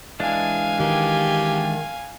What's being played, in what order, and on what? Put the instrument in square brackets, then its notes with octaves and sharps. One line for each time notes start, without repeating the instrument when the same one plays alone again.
[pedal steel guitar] E3 G#3 D4 [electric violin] F5 G#5
[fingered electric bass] D#3 [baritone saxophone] G4